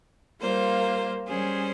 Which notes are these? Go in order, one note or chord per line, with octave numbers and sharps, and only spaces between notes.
G3 A#3 F4 C5
G3 C#4 G#4 C5